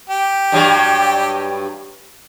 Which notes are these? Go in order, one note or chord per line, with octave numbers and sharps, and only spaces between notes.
G4
G2 F#3 G3